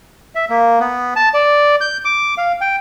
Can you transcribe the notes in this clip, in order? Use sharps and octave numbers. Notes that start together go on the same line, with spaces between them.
E5
A#3
B3
A5
D5
G6
D6
F5
G5